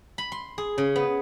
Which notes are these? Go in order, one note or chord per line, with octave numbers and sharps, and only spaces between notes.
B5
C6
G#4
C#3
B3